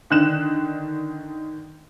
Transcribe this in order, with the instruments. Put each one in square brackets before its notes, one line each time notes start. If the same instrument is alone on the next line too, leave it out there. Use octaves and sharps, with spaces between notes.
[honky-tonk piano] D3 D#3 F#6 E7